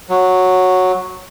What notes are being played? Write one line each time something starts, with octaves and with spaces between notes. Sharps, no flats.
F#3